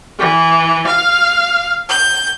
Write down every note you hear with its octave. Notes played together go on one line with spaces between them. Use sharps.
E3
F5
G6